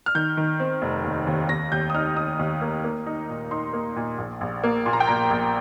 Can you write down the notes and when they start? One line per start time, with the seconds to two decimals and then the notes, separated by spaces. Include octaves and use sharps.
0.06 F6
0.15 D#3 G6
0.37 D#3
0.60 C4
0.82 F1
1.04 D#2
1.27 D#2
1.49 D#2 A#6
1.72 D#2 G6
1.90 D#6
1.94 D#4 F6
2.16 D#4 D#6
2.39 D#2
2.62 A#3
2.84 A#3
3.06 D#4
3.29 A#2
3.51 D#4 C6
3.73 A#3
3.96 A#2
4.18 A#1
4.41 A#1
4.64 A#3
4.86 A#2 C6
4.93 A#5
5.00 G5
5.08 A#2 A#5
5.31 A#1